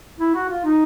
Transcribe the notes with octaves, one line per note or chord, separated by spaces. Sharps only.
E4
F#4
F4
D#4